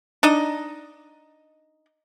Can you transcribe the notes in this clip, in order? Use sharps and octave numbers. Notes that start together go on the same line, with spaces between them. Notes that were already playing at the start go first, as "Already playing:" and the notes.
D4 D#4 D#5